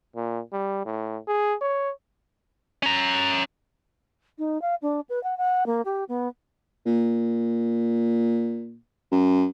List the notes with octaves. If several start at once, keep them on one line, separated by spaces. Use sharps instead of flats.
A#2
G3
A2
G#4
C#5
C#4 A#5
D#4
F5
D4
B4
F#5
F#5
A#3
G4
B3
A#2
F#2